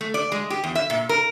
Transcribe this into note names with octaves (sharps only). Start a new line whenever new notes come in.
A3
D5
G#3
G4
E2
E5
A#2
A#4